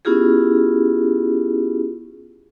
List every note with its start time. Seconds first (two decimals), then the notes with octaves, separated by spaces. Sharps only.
0.05 B3 C#4 E4 F4 G4 G#4